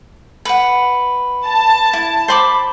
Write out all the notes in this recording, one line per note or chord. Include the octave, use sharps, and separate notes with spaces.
B4 F#5
A5
E4
C5 B5 D6